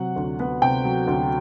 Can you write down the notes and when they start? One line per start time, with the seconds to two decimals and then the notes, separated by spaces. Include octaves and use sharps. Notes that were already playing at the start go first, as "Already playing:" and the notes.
Already playing: C3 F#3 F#5
0.16 D2
0.40 B3
0.62 C3 G5
0.85 F#3
1.07 D2